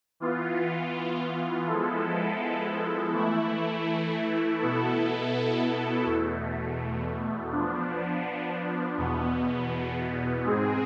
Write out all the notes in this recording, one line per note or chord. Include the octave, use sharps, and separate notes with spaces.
E3 B3 F4
F3 G#3 B3 E4 A4
E3 A3 E4
B2 B3 E4 A4
E2 B2 A3
F3 B3 D4
E2 B2 B3
G#2 G#3 C4 G#4